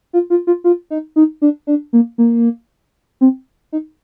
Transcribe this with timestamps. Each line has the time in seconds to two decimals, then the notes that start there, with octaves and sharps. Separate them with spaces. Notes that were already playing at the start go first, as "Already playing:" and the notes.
0.13 F4
0.30 F4
0.47 F4
0.64 F4
0.90 D#4
1.16 D#4
1.42 D4
1.67 D4
1.93 A#3
2.18 A#3
3.21 C4
3.72 D#4